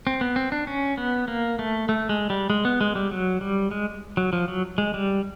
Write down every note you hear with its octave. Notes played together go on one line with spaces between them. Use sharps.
C4
B3
C4
D4
C#4
B3
A#3
A3
A3
G#3
G3
G#3
B3
G#3
G3
F#3
G3
G#3
F#3
F3
F#3
G#3
G3